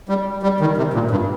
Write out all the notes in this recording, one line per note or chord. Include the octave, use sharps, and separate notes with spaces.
G3
G3
D#3
C3
A#2
G2